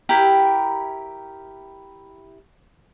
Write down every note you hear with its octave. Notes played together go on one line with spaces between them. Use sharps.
E4 G4 A#4